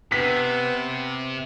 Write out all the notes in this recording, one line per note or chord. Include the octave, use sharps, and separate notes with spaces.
C3 B3 B4 B6